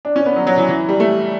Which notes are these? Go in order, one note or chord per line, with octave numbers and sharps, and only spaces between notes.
D4
C#4
B3
F#3
F#3
E3
E3
G3
A3